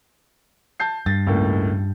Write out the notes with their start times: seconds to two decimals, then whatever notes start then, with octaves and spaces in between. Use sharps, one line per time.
0.80 A5 G6 C7
1.06 G2 A6
1.27 C#2 A2 A#3